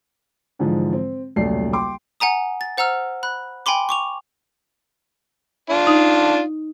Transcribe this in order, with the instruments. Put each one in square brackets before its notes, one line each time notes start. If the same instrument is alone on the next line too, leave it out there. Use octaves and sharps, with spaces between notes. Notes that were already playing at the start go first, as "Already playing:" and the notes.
[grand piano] G#2 D3 E3 F3 G#3
C4
D#1 B1 C#3 A3 D5 C7
G5 C6 D6
[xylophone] F#5 G#5 A#5 D#6
A6
C5 F#5 A#5 E6 F6
B5 F#6
G5 G#5 B5 C6 D6
C#6 D6 F7
[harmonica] D4 F4
[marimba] D#4